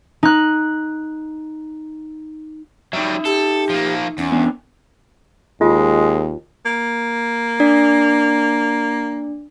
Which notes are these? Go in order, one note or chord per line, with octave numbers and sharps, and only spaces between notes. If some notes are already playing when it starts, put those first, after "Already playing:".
D#4 F#6
F#3 G3 D#4 E5
G4 A4
F3 A#3
E2 C#4
B3 D4
D#2 G#3 F4
A#3
D4 D5